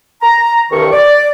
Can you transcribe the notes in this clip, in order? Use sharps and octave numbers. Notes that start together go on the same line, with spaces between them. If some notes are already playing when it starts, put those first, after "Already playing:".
A#5
C2 G2 D#3 C#6
D5